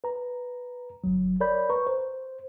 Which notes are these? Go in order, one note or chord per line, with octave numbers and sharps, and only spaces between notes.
B4 A#5
G1 F#3
A#4 C#5 D5 B5 G6
B4 A#5 C#6
C5